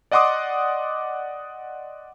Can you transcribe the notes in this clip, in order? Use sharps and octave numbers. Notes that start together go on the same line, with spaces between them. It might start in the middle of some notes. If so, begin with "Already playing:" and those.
D5 D#5 F#5 C6 D6 D#6